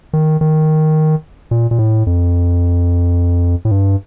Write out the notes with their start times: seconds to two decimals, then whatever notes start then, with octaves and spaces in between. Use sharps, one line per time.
0.13 D#3
0.41 D#3
1.51 A#2
1.71 A#2
1.78 A2
2.07 F2
3.65 A2
3.71 G2